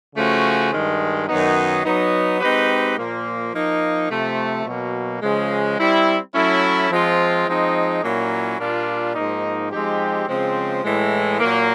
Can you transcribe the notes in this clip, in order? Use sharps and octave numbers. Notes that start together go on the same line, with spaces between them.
C#3 F3 A3 C#4 F#4
G2 D#3 G#3
F#2 D#3 F#3 B3 D#4
F#3 B3 D#4
G#3 C4 D#4 G4 B4
A#2 F3 A#3
F3 A#3 D#4
C3 F3 A3
B2 F#3 A#3
C#3 F3 G#3
G3 C4 E4
F#3 A3 C#4 E4
F3 G#3 C4 F4
F3 G#3 C4 D#4
A#2 F#3 A#3 C#4 E4
A#2 G3 A#3 D4 F4
G#2 F3 A#3 D#4
F3 G#3 C4 D#4 G4
C#3 F3 G#3 C4
A2 E3 G#3
A#2 F#3 A#3